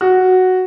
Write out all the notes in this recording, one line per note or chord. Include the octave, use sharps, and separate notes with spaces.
F#4